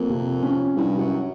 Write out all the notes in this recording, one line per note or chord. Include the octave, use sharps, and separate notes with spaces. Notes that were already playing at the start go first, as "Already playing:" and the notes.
Already playing: F2 A#3
C3
C#4
C2 G2
F#2